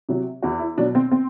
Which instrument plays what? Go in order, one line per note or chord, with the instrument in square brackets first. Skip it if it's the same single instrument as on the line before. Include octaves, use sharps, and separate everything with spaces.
[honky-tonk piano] C3 F#3
E2 F#4
E4
B2 F#3 D4
C4
C4